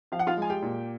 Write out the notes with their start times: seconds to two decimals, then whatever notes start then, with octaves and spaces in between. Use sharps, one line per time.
0.12 F3 F5
0.19 F#5
0.27 F4 F5
0.37 G#3 G#5
0.50 G4 G5
0.62 A#2